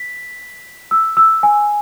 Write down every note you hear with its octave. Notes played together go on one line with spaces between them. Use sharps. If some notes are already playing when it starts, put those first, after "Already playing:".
Already playing: B6
E6
E6
G#5